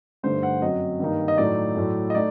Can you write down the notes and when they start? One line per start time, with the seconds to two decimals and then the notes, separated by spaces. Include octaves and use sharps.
0.23 G2 D3 A3 D#4 C5
0.43 F#5
0.62 F#2 F#3 C4 D#5
1.00 G2 D#3 G3 A#3 D#4
1.28 D#5
1.38 A2 F#3 A3 D#4 D5
1.76 A2 F#3 A3
2.10 D#5
2.14 A3 D#4 D5